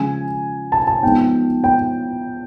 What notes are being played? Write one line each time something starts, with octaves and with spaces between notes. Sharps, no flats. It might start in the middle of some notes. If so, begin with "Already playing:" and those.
Already playing: C#3 F3 G#3 G#5
A5
A5
F3 G#3 B3 D#4 G5
G5